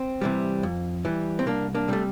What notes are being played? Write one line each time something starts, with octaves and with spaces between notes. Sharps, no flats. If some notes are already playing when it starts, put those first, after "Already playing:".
Already playing: C4
C3 E3 G3
F2
E3 G3
C4
C2 A#3 D4
A#3 D4
C3 G3 A3